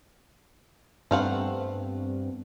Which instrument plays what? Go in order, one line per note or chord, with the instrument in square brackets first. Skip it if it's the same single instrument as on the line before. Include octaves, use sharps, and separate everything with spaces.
[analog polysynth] G2 [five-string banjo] A3 F5 F#5 [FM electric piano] B3 C4